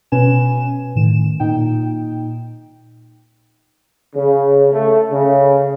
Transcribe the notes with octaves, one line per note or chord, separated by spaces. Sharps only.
B2 C#4 B4 G#5 E7
A2 D#3 E7
A#2 D#4 G5
C#3
A3
C#3